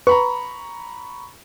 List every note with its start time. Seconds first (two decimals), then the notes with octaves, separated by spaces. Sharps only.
0.07 B4 A#5 B5 C#6